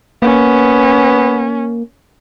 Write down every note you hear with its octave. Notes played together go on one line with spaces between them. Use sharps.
A#3 B3 C#4